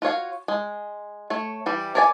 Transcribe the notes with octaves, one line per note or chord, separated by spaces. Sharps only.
F4 F#4 C#5 F5
G#3
A3 C#5
E3 G3
A#4 C#5 D5 E5 G#5